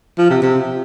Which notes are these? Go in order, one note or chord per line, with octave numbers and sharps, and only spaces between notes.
F3
C3
C3